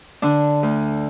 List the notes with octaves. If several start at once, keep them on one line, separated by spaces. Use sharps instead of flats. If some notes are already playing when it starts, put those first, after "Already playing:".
D3 D4
D2